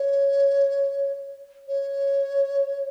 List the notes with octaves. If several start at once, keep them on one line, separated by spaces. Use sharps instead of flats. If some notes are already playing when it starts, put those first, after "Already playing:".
Already playing: C#5
C#5